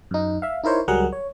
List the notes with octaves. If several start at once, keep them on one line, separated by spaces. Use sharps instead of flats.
F#2 D#4
E5 F5
D#4 E4 A#4 C5 C#5
C#2 F#3 G3 G#4 A#4 F#5
C#5